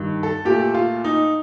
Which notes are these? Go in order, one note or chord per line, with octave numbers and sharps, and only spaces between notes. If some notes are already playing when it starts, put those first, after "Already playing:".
Already playing: G2 D#3 G3
A4
A#2 A3 G4
F4
D#4